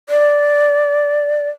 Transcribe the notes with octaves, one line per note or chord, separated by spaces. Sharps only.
D5